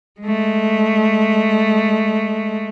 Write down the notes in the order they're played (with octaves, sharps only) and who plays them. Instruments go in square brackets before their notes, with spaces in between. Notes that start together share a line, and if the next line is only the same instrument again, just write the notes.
[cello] G#3 A3